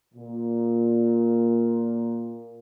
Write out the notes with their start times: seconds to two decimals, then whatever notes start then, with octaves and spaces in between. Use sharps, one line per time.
0.14 A#2